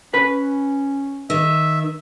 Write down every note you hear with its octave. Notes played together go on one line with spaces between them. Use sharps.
C#4 B4 B5
D#3 E5